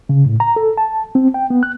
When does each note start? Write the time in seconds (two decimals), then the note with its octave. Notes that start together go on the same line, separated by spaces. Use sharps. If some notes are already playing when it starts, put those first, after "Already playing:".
0.09 C#3
0.26 A2
0.40 A#5
0.56 A4
0.77 A5
1.15 C4
1.34 G5
1.50 B3
1.63 F#6